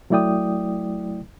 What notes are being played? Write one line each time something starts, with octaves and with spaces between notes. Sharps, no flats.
F#3 A3 E4 D5 G5 D#6